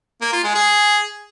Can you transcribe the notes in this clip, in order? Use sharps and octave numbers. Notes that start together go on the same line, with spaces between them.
A#3
F4
G#3
G#4